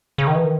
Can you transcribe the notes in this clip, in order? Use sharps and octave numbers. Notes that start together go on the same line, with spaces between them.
C#3
D#3
E3
D#3